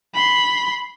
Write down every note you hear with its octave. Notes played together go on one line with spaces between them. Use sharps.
B5 C6